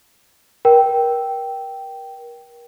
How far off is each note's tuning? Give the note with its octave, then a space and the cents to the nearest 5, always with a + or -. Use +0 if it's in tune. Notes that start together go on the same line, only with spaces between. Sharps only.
A#4 +30 G5 -10